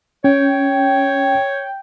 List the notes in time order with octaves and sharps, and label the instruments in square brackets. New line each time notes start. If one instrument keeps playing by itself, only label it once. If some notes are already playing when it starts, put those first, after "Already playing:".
[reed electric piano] C#4 [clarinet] C#5 [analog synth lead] G5